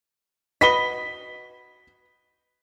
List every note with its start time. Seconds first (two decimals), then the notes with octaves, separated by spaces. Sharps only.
0.61 F#4 B4 D#5 B6 G7